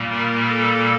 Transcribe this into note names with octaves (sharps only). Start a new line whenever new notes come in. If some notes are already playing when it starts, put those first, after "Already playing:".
Already playing: A#2 G3 A#3
A#4
A4